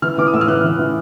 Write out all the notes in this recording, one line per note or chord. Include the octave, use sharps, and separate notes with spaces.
E3 F6
E3 D6
D#6
A2 E6
F6
E3 F#6
E3
E3